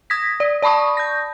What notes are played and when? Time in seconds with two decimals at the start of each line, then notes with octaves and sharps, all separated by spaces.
0.10 D#6 G#6 A#6 B6
0.40 D5
0.62 D5 A5 B5 C#6 D#6
0.97 G6 A#6